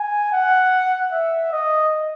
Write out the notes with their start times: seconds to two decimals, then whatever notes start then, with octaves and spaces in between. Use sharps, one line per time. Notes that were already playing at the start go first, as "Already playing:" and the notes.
Already playing: G#5
0.33 F#5
1.12 E5
1.52 D#5